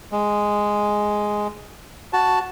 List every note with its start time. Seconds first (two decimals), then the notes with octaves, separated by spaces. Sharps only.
0.12 G#3
2.13 F#4 A5